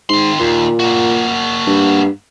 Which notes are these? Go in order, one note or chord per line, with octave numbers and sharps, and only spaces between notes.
G#2 D#3 C6
D#2 A#2
A#3 F#4
G2